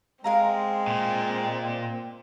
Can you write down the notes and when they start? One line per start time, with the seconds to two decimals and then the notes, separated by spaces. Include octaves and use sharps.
0.24 G#3 C4 A#4 F5 A#5
0.87 A#2